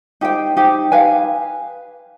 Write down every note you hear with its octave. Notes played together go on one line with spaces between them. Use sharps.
D#4 G4 C5 G5
D#4 G4 C5 G5
B4 F5 G#5